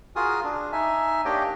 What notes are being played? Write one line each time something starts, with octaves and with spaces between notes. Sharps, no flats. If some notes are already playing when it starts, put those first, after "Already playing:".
F4 F#4 G#4 A#4 G#5 D#6
D4
D#4 E5 G#5
A#3 D4 G4 C#5 D#5 G5